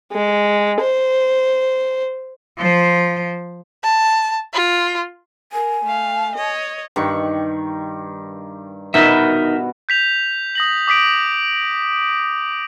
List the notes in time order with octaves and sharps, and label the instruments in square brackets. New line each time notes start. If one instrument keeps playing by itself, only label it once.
[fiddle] G#3
C5
[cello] F3 C5
[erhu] A5
F4
[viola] A#4 [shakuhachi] G#5
[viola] A3 F5
C#5 D#5
[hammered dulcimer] G2 D#3 C#6
[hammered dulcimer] B2 B5 [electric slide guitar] D#4 A#4 E5
[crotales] G6 B6 F7
D#6 A#6 F#7
D6 D#6 B6 D7